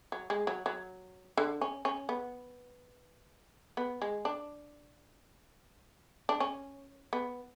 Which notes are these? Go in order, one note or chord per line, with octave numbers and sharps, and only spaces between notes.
F#3
G#3
F#3
F#3
D3
C#4
C#4
B3
B3
G#3
D4
D4
C#4
B3